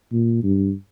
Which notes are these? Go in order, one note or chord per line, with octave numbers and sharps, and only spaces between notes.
A#2
G2